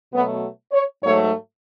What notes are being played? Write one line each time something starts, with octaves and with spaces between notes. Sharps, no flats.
B2 F#3 A3 B3
C#5
G#2 F#3 A3 C#5